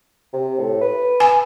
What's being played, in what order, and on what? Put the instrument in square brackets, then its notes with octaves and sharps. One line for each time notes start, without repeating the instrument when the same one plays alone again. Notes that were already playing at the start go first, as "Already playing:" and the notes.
[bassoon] C3
A2
B4
[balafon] G#5